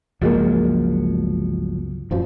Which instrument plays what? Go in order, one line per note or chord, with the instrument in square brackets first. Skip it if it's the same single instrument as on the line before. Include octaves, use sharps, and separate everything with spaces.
[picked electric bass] G1 F3 F#3 [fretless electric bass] C#2 G#3 A#3
[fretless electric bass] D1 F#2 F3